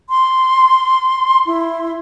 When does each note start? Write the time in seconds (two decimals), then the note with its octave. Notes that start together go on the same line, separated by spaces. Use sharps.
0.09 C6
1.46 E4